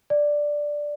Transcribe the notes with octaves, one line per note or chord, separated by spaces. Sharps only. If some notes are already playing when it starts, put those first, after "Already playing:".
D5